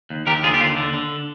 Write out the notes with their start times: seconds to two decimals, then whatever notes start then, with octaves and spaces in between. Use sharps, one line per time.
0.10 D#2
0.27 D#2 G4 A#4
0.43 D3 F4 G#4
0.54 G4
0.60 D#2 F4
0.77 D3
0.94 D3